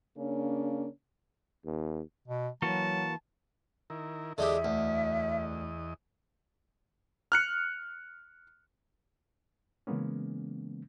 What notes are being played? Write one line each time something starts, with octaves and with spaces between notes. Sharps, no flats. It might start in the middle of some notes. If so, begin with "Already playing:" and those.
C#3 A#3 C#4 D4
D#2
B2
E3 F#3 A#3 F#4 A5
D#3 E4 A#4
E2 D3 G#3 G4 D#5 E5
D2
F6 F#6 C#7
C#3 E3 G#3 A#3 B3 C#4